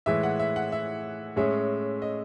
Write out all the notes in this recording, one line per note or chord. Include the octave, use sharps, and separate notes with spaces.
A2 E3 G#3 E5
F#5
E5
F#5
E5
A2 G#3 C#4 G#4 E5
D#5